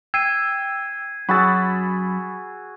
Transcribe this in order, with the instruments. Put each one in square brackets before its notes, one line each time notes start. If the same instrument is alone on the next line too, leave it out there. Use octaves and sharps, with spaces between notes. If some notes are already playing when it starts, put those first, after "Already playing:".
[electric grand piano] G5 E6 [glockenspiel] G#6 C7 D#7
[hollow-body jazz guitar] F#2 [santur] F#4 G#4 E6 [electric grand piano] B5 A6